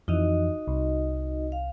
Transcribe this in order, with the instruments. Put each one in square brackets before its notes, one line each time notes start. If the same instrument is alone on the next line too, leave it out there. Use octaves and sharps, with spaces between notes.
[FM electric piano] F2 E3 [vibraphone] D#4 F#4 D#5
[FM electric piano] C2
[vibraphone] F5